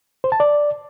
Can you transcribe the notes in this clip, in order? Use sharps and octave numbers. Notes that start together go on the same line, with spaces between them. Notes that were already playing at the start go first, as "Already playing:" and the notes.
C5
A5
D5